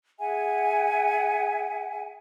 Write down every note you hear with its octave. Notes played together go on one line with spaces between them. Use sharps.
G#4 E5 F#5 G#5